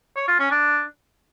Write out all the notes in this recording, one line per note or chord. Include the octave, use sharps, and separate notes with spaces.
C#5
F4
C#4
D4